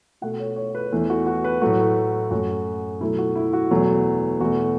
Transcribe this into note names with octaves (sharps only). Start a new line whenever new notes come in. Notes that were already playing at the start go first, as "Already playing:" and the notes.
B2 A3 F#5
C#5
C#5
B4
E2 E3 A3
F#4
F#4
B4
A2 F#3 A3 F#4
F#2 F#3 A3 F#4
B2 F#3 A3 E4
F#4
E4
F#4
E2 B2 F#3 A3
E2 B2 A3 F#4